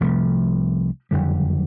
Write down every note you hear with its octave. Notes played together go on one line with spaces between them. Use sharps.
C2 C3 F3 A3
F#1 F2 D3 G3